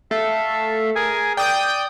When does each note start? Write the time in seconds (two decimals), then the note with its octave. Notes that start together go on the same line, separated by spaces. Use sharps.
0.11 A3 A4 E5 F5
0.95 G#4 A#4 G#5
1.37 D5 G5 D#6 G6